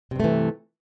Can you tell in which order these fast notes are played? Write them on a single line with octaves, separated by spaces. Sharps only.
C3 G2 A3 E3